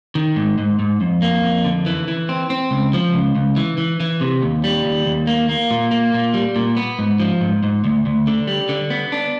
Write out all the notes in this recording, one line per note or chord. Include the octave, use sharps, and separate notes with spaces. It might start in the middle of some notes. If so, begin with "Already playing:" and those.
D#3
G#2
G#2
G#2
F2
A#3
F2
D3
E3
E3
C4
C4
C#2
F3
C#2
C#2
E3
E3
E3
C3
D#2
G3
D#2
D#2
A#3
A#3
A#2
A#3
A#2
G3
A#2
B3
G#2
F3
G#2
G#2
D2
D2
D3
G3
D3
B3
D4